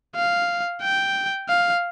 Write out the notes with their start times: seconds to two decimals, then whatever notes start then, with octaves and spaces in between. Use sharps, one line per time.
0.16 F5
0.82 G5
1.49 F5